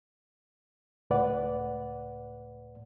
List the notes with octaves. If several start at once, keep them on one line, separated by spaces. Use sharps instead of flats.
C#2 A2 B4 D5 F#5